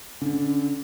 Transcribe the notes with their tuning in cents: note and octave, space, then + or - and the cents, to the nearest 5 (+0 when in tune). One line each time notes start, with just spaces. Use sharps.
D3 -15 C#4 +5